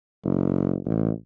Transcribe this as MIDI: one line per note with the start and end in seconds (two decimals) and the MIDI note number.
0.25 0.77 30
0.85 1.10 33